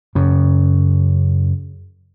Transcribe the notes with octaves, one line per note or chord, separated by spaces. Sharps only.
F#2 C#3